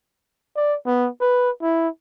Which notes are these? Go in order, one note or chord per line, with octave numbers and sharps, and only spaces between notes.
D5
B3
B4
E4